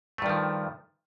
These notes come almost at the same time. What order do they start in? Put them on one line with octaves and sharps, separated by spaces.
A3 G2 D#3 F3